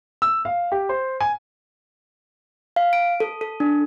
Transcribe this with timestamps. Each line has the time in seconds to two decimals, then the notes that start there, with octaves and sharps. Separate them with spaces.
0.22 E6
0.45 F5
0.72 G4
0.89 C5
1.21 G#5
2.76 F5
2.93 D7
3.20 A4
3.41 A4
3.60 D4